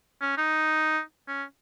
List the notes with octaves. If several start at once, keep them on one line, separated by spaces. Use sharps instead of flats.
C#4
D#4
C#4